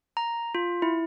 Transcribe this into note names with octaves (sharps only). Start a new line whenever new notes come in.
A#5
F4
E4